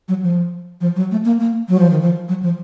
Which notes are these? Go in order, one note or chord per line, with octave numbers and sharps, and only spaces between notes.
F#3
F3
F3
F#3
A3
A#3
A#3
F#3
F3
D#3
F3
F#3
F3